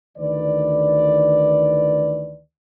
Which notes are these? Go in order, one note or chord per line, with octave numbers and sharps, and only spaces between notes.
D2 D#3 E3 B4 D5